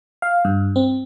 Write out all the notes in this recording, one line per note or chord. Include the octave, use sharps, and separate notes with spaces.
F5
G2
C4